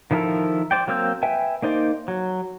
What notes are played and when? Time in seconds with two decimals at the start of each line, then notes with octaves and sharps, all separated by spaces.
0.11 D#3 F3 E4 A4 A#4
0.71 C5 D5 G5
0.87 F#3 A#3 C4 E6 G6
1.23 B4 E5 G5 G#5
1.62 A#3 D#4 C5 D5
2.08 F#3